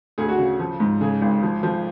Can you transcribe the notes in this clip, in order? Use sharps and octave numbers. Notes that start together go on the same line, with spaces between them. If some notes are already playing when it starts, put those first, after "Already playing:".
D2 G#4
F#4
C#3
F3
G#2
C#3 G#4
G#1
F3
F3